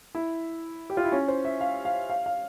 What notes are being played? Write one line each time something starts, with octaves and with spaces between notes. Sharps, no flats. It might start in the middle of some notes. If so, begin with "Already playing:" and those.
E4
G4
F4
E4
C#4
C5
E5
F5
F5
F5
F5